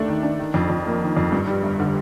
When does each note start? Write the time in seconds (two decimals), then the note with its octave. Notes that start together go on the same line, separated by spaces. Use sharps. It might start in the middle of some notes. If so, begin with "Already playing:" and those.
Already playing: D#2 A3 D4
0.08 D#3
0.23 D4
0.39 D#3
0.54 F2
0.70 F2
0.86 A#3
1.02 D#3
1.17 F2
1.32 G2
1.47 G3
1.63 G1
1.80 D3